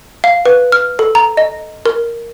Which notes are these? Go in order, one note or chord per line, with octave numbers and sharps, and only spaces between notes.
F5
B4
F6
A4
A#5
D#5
A#4